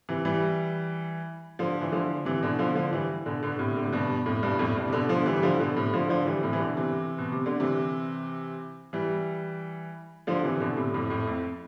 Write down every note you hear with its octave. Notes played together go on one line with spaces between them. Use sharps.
C3 E3
E3 G3
D3 F3
E3
D3 F3
C3 E3
B2 D3
D3 F3
D3 F3
E3 G3
B2 D3
B2 D3
A2 C3
D3
C3
G2 B2
F2 A2
G2 B2
F2 A2
G2 B2
C3
B2 D3
D3 F3
E3 G3
G3
D3 F3
B2 D3
A2 C3
D3 F3
D3 F3
E3 G3
A2 C3
E3
B2 D3
C3 E3
B2
C3
D3
C3 E3
E3 G3
D3 F3
C3 E3
B2 D3
A2 C3
F2 A2
F2 A2
F2